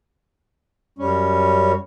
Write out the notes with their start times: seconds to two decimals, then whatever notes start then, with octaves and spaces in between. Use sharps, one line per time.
0.99 F#2 G3 C#4